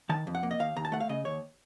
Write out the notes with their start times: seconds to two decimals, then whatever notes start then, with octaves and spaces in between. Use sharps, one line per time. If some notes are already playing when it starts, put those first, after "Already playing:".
0.09 D#3 A5
0.27 F2
0.35 F#5
0.43 A#3
0.51 D#5
0.60 D#2 F5
0.76 D#2 A#5
0.85 A5
0.92 A3 F#5
1.00 F5
1.09 C#3 D#5
1.25 D#2 C#5